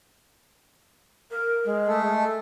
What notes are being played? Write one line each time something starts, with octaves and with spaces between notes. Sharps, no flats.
A#4
G#3
A3 A4